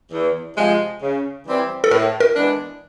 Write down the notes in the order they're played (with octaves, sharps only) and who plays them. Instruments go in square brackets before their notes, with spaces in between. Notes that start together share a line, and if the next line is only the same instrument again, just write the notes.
[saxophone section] E2
C3 F3 G#3
C#3
E3 G3 C4 E4
[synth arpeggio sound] A4
[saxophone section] A2 [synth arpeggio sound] A#4
[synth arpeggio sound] A#4
[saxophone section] E3 G#3 B3 D4